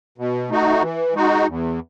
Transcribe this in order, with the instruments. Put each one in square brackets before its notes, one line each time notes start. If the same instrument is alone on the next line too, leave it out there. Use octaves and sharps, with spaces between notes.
[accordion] B2
A3 D#4 F#4
E3
G#3 D#4 F#4
E2